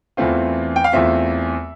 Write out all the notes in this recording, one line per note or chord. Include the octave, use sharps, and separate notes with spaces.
E2 E3 A3 C4 F4
G5
F5
E2 E3 A3 C4 F4 E5